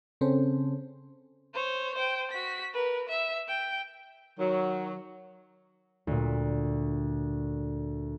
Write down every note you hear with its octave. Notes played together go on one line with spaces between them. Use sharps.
C#3 C4 C#4 A4 C5
C5 C#5
C5 G5
F#4 B6
A#4 B4
E5
G5
D#3 F#3
D2 A#2